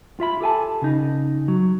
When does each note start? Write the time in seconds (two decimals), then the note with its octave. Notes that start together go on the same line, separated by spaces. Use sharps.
0.20 F4 E5 B5
0.41 G4 A4 G#5 A5
0.82 C#3 D#4
1.48 F#3